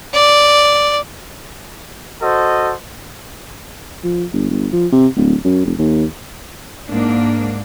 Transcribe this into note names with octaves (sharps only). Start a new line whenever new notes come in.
D5
F#4 A4 C5 D#5
F3
G1
G1
F3
C3
D1
F#2
F1
D#2
G#2 A#3 D4